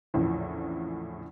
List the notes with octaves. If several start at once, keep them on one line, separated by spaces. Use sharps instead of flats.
A#1 E2 A2 C#3 F3